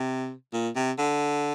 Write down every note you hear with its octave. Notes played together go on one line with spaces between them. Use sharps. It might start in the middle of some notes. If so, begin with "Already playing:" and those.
Already playing: C3
A#2
C3
D3